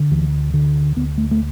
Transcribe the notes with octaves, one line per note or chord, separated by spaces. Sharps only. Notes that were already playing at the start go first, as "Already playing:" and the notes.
Already playing: D3
D2 E3
D3
D2 B3
A3
A3